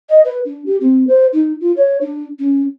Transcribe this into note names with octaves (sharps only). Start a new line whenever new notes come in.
D#5
B4
D4
G4
C4
C5
D#4
F4
C#5
D4
C#4